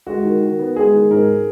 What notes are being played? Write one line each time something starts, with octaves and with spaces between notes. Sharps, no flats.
G#3 F#4
D#3
D#3
B3
G#3 G#4
D#3
G#2 A#4